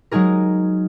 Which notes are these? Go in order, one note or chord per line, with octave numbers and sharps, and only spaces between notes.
F#3 G#3 D#4 G#4 A#4